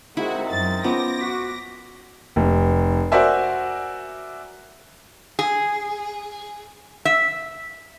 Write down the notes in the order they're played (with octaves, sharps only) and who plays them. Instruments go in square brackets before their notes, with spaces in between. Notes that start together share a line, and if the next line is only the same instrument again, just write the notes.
[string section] G#3 F#4 [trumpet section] C4 D#4 A#4 [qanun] E4
[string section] F#2 A6
[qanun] B3 [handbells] C#4 F4 C5 [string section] D6 A#6
[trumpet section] F#4 [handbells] B6
[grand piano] F1
F#4 A#4 C5 D5 E5 G#5
[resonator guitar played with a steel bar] G#4
E5